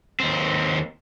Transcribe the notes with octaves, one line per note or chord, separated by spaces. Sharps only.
D#2 C4